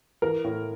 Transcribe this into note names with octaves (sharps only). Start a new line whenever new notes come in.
E3 A#4
A2